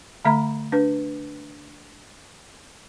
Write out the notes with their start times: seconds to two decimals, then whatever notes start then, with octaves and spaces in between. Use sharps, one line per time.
0.25 D3 A3 E5 A#5 B5
0.72 D4 B4